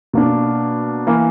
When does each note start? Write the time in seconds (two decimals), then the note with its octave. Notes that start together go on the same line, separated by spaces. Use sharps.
0.13 B2 A#3 D4
1.07 E3 A#3